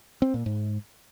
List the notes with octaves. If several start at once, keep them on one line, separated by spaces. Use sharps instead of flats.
C4
A#2
G#2